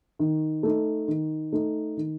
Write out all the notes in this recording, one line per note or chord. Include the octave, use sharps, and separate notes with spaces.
D#3
A3 D#4
D#3
A3 D#4
D#3